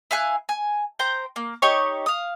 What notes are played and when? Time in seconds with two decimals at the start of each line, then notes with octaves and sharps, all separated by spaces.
0.11 E4 F5 G#5 F#6
0.49 G#5
0.99 C5 G5 A#5
1.36 A#3
1.62 D#4 G4 C#5 C#6
2.06 F5 D#6